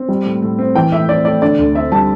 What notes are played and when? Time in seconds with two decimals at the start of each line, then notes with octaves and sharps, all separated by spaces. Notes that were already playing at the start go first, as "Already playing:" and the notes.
Already playing: C4
0.09 G3
0.26 A2
0.42 A2
0.59 C4
0.75 E3 G5
0.92 A2 E5
1.09 C4 D5
1.25 A3 D5
1.42 D3 D5
1.58 D2
1.75 C4 E5
1.92 G3 A5